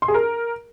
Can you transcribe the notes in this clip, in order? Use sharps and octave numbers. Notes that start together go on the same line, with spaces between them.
C6
G#4
A#4